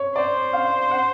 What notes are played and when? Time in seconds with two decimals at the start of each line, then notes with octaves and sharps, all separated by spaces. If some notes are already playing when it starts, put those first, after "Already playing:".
Already playing: C#5
0.15 C5 D5
0.53 F5
0.91 F#5